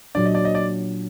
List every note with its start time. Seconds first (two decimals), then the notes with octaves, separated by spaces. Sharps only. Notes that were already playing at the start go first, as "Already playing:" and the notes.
0.15 A#2 F#3 D4 D5
0.26 D#5
0.35 D5
0.45 D#5
0.55 D5